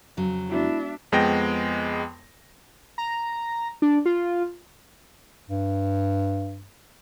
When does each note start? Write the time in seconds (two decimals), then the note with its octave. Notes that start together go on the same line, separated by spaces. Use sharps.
0.17 F2 C#3 F#3
0.51 G#3 B3 D4 E4 F#4 E5
1.12 F2 G#3 B3 G5 A#6
2.98 A#5
3.82 D4
4.06 F4
5.50 G2